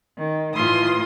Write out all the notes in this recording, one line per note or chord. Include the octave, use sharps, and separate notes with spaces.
D#3
A2 E3 F4 C6 D#6